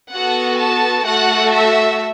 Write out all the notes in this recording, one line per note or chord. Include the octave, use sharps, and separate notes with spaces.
B3 F#4 A4 F#5
A5
A3 F#4 A4 F#5
E5